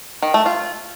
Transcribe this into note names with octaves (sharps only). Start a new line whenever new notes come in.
D#3
A3
F4